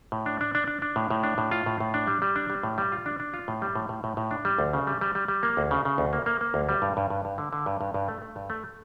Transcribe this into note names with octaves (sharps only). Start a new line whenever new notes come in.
A2
D4
D4
D4
D4
D4
A2
A2
D4
A2
F4
A2
A2
D4
G3
G3
D4
G3
A2
G3
F4
D4
D4
F4
A2
G3
A2
A2
A2
A2
D4
G3
D2
C#3
G3
G3
G3
G3
A#3
D2
C#3
C#3
D2
A#3
A#3
A#3
D2
G3
G2
G2
G2
G2
D3
D3
G2
G2
G2
A3
A3
G2
A3